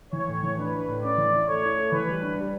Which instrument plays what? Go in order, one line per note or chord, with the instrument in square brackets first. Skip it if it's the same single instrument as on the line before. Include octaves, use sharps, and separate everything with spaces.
[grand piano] E3 [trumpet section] C#5
[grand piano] A2
E3
[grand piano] D4 [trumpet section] B4
[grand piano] D4
A2
[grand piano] C#4 [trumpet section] D5
[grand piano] E3
E4
[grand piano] A3 [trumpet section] C#5
[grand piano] E4
A3
[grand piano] E3 [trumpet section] B4
[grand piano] G3
D4
G3